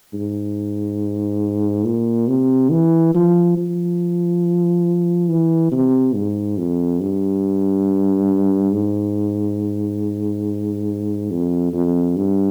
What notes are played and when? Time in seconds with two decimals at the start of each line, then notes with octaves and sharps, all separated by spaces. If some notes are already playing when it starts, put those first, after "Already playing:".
0.13 G#2
1.85 A#2
2.28 C3
2.71 E3
3.14 F3
3.57 F3
5.29 E3
5.72 C3
6.14 G#2
6.58 F2
7.01 G2
8.73 G#2
11.31 F2
11.73 F2
12.16 G2